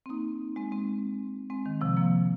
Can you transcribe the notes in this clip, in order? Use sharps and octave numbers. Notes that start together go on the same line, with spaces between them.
C4
A#3 D#4
G#3 C4
G#3 C4
G#3 C4
D#3
C3 F3
F3 A#3